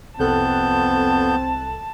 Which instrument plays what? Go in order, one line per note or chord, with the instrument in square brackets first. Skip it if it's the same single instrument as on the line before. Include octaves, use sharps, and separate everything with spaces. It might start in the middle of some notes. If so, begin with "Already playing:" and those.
[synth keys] C2 A4 F#6 [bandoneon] F2 B3 G6 [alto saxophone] C4 [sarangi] A5